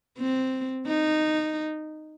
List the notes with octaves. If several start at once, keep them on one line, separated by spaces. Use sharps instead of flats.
C4
D#4